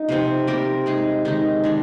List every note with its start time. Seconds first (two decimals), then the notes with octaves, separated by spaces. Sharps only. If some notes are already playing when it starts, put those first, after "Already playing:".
Already playing: D#4
0.09 C3 F3 C4
0.47 G3 C4 G4 A#4
0.86 G#3 D#4 G#4
1.25 D#3 G#3 D#4
1.64 D#3 G#3 D4